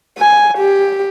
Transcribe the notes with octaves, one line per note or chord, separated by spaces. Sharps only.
G#5
G4